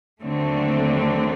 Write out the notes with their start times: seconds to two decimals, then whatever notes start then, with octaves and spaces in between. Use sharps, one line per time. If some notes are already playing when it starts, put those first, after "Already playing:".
0.22 D#2 D3 F#3 A3 C4